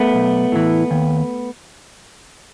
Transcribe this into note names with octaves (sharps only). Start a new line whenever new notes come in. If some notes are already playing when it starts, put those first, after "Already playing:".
Already playing: A3 B3
B1
A2 E3
D#2